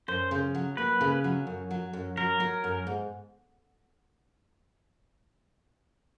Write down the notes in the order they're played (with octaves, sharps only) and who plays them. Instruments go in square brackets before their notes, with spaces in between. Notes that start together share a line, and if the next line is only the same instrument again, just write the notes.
[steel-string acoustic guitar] F#2 [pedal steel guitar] C5
[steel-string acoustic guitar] C#3
F#3
[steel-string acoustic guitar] A#3 [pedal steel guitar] B4
[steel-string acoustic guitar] C#3
F#3
F#2
F#3
F#2
[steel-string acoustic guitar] F#3 [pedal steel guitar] A#4
[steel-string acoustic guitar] F#3
F#2
G#2